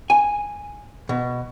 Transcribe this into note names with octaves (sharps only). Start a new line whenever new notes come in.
G#5
B2